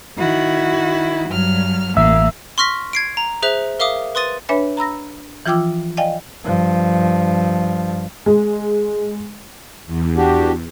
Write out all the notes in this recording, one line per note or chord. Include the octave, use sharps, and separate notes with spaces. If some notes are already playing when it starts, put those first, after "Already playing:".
D#3 E4 F#4
G2 F#3 F6
A1 A#3 E5 F5 E6
C6 C#6 F6 A#6 B6
G#6 C7 D7
A#5
G#4 C5 E5 F#6 F7
A#4 E5 F5 D6 D#6
B4 C6 D#6 A6 D#7
D4 B4 C#5 E5 G#5 B5
A#5 B5 E6 A#6
E3 F3 F4 G5 D6 E6
D5 D#5 F5 G5 G#5
G2 F3
G#3
E2
D4 F#4 G4